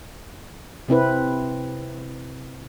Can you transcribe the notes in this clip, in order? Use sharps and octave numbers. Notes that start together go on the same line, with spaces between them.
C3 C4 E4 B4